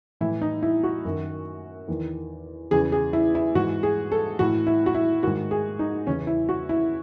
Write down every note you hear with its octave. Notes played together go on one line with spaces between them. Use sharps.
A2 E3 E4
D#4
E4
F#4
F#2 D#3
E2 D#3
E2 C#3 E3 G#4
G#4
E4
E4
G#2 E3 F#4
G#4
A4
A2 E3 F#4
E4
F#4
E4
G#2 D#3 F#4
G#4
D#4
E2 C#3 E3 C#4
E4
F#4
E4